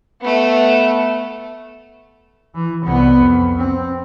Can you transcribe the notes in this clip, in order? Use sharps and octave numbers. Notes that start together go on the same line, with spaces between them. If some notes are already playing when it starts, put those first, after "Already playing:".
A3 B3
E3
C2 B3
F2
C4